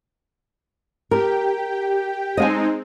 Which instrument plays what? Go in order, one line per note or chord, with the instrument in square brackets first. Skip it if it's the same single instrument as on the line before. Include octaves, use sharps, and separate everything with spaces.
[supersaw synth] G4 G5 [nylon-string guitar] A#4
[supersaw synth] G#3 C4 D#4 [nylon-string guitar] D#5 F5 G#5